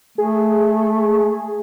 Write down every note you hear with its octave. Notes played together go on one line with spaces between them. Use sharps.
A3 G#4